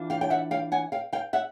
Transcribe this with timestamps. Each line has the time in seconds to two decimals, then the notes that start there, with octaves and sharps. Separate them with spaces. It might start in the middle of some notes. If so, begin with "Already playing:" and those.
Already playing: E3 D4 F4
0.10 F5 G5
0.21 G5
0.30 E5 F#5
0.51 F5 G5
0.72 F#5 G#5
0.92 F5 G5
1.13 F5 G5
1.33 E5 F#5